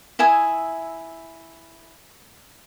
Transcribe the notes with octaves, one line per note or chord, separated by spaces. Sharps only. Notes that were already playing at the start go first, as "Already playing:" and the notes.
E4 E5 G#5 D#6